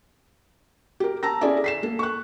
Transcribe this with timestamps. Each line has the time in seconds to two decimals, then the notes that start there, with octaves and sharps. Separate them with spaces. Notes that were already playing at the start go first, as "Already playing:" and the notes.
1.00 G4 A#4
1.23 A5 A#5 E6 A#6
1.41 C#4 E4 G#4 A4 D5 E5
1.64 B6 C7 E7
1.83 A#3 A4
1.99 C#6 F#6